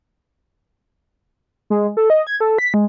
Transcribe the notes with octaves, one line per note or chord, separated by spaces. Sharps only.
G#3
A4
D#5
G#6
A4
B6
G#3